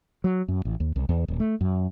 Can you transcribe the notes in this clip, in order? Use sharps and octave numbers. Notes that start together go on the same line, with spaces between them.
F#3
F#2
A1
D#2
C2
E2
D#1
A3
F#2